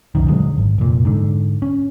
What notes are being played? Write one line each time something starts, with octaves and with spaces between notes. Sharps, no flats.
C2 F#2 D#3
D#1 D3 F#3 G#3
G#1
F1 A#2
G#2 D3
C#4